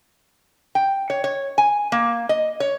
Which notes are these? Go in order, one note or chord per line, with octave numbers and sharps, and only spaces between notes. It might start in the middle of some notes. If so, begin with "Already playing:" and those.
G5
C#5
C#5
G#5
A#3
D#5
C#5